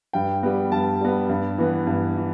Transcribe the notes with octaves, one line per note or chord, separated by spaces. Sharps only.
G2 G5
G3 B3
G2 A5
G3 B3
G2
E3 B3
G2
E3